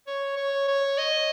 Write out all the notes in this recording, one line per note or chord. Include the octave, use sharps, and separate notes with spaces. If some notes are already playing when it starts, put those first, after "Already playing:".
C#5
C#5
C#5
D#5